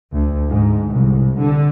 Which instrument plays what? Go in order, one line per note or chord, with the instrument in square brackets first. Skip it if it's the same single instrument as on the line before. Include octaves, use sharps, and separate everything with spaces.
[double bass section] D2
G#2
C2
D3